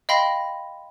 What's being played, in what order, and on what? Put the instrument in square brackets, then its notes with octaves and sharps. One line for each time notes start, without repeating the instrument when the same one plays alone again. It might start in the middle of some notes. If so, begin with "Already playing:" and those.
[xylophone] D#5 F5 G5 B5 C6 A#6